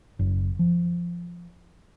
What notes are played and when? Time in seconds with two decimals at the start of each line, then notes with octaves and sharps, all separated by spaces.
0.19 F#1
0.59 F3